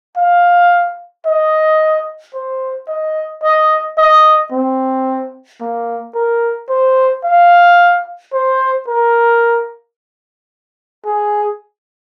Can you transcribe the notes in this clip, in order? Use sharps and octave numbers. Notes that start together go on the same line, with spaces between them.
F5
D#5
C5
D#5
D#5
D#5
C4
A#3
A#4
C5
F5
C5
A#4
G#4